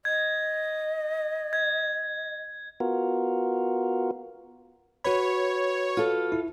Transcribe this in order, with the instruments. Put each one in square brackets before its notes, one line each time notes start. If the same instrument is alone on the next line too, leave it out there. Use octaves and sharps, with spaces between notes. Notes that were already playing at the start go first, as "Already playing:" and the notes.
[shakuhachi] D#5 [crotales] G#6
[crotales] G#6
[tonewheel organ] B3 F4 F#4 A#4
[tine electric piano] F#4 B4 B5 [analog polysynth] C#5
[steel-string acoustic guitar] F4 A4
[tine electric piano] E4